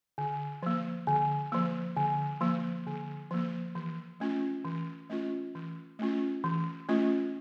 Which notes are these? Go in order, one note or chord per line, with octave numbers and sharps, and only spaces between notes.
D3
F3 A#3
D3
F3 A#3
D3
F3 A#3
D3
F3 A#3
E3
A3 C#4 F4
E3
A3 C#4 F4
E3
A3 C#4 F4
E3
A3 C#4 F4